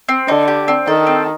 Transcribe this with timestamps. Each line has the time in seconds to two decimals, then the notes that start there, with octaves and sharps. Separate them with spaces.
0.09 C4
0.28 D3 D#4
0.48 G4
0.68 C4
0.87 D#3 A4
1.07 C4